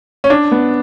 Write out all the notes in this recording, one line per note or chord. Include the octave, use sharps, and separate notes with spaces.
C#4
D4
B3